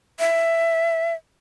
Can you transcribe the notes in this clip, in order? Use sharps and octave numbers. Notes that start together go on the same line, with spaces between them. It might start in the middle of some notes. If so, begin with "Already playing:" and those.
E5